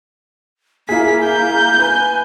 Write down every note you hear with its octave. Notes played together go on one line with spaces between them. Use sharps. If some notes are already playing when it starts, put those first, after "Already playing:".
A#3 E4 G#4 B6
G6
B4 G#5